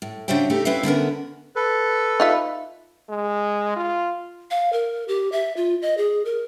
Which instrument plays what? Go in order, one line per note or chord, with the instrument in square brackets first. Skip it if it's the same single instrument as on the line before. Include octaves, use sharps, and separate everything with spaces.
[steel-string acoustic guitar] A2
C#3 D4 F#4 C5 E5 G5
A3 D#4 G4
C4 C#4 E4 B4 E5 F5
D3 B3 C#4 A#4
[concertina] A4 B4
[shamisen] D#4 F4 E5
[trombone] G#3
F4
[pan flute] F5
A#4
G4
E5
F4
D#5
G#4
A#4